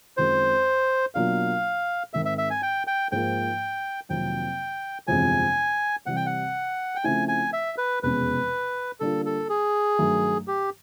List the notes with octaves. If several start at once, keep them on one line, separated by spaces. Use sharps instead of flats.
F#2 D#3 G#3 C4 F4 C5
B2 F#3 A#3 D4 F4 F5
G#2 D#3 G#3 C4 E5
E5
E5
G#5
G5
G5
G#2 F3 A#3 G5
F2 C3 D#3 F#3 A#3 G5
G1 F2 C3 E3 G#3 G#5
C3 E3 G3 F#5
G5
F#5
G5
C#3 F3 A3 C4 E4 G#5
G#5
E5
B4
F1 E2 B2 G#3 C#4 B4
D3 G3 A#3 D4 F4 A4
A4
G#4
G2 D#3 F#3 A3
G4